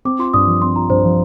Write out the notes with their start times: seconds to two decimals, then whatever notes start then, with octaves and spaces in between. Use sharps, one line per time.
0.05 C4 D6
0.19 F4 C6
0.34 G2 D#6
0.47 F3
0.62 C4 C6
0.76 F4 A#5
0.89 G2 C5
1.04 F3